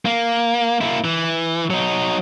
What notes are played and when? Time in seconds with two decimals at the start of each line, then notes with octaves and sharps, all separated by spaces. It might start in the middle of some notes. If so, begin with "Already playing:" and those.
0.05 A#3
0.81 A#3 E4
1.05 E3
1.70 F#3 D#4